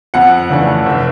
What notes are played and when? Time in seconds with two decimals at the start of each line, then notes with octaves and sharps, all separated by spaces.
0.14 F2 F#5
0.50 C#3 E3 A3 D4
0.86 F1